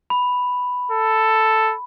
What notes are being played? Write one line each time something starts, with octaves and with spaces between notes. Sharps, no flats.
B5
A4